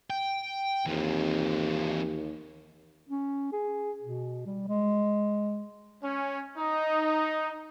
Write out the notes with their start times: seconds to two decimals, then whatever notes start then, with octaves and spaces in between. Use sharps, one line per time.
0.10 G5
0.86 D#2 E3 C4
3.09 C#4
3.53 G#4
4.02 B2
4.46 G3
4.68 G#3
6.02 C#4
6.58 D#4